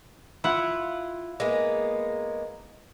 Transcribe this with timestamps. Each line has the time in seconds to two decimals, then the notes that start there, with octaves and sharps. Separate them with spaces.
0.44 E4 F4 F#5
1.40 G#3 A#3 B3